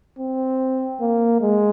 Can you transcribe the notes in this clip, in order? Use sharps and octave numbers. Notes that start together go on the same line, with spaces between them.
C4
A#3
G#3